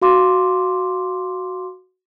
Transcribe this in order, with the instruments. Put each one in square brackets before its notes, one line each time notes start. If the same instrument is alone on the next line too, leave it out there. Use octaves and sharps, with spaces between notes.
[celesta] F#4 F5 C6 D6